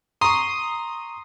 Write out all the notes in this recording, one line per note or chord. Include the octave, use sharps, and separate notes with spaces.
A#5 C6 C#6 D#6